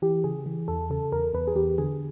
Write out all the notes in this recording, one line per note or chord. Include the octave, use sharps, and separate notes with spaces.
E3 G4
C#3 G#4
E3
E2 A4
C#3 A4
E2 A#4
E2 B4
G#4
E2 G4
D3 G#4